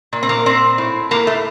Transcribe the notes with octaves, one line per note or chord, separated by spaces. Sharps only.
A#2
C4
A#3
A#2 C4
A2
A2 A#3
A3